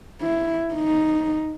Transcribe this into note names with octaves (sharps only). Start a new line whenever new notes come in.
E4
D#4